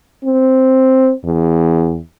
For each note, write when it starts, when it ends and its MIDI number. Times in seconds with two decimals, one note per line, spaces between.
0.24 1.11 60
1.25 2.00 40